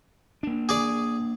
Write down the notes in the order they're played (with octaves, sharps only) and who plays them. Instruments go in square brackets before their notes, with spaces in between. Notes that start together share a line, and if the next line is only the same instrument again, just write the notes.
[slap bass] A#3 D4
[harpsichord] G#4 D5